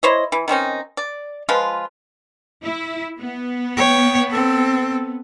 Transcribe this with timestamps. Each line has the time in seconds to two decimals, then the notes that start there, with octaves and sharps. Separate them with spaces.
0.03 E4 C5 C#5 D#5
0.32 E3
0.48 D#3 C4 C#4 D#4
0.97 D5
1.49 F3 G#3 F4 B4
2.63 E4
3.19 B3
3.76 C#5 G5
4.30 C4 A4